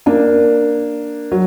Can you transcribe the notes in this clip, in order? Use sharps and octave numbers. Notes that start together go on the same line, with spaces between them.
A#3 D4
F#3